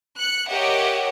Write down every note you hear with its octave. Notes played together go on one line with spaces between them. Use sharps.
F#6 C#7
G4 A#4 C#5 D#5 E5 F#5